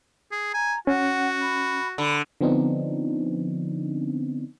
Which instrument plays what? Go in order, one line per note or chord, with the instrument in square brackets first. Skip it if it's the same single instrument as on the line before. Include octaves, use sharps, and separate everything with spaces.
[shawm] G#4
[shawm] G#5 [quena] A#5
[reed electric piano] C#4 [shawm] F#4 [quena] F#5
[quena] B5
[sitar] D3 [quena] B5
[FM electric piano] D3 F3 B3 C4 D4 D#4